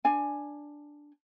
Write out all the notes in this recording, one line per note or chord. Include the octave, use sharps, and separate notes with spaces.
D4 G#5